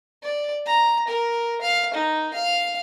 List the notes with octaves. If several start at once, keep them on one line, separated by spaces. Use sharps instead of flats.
D5
A#5
A#4
F5
D#4
F5